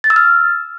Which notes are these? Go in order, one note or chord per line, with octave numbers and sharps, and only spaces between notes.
A6
E6
F6